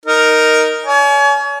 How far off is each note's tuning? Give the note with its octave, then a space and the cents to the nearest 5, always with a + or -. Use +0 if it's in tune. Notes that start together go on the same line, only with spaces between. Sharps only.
D#4 +0 A#4 +0
C#5 +35 G#5 +35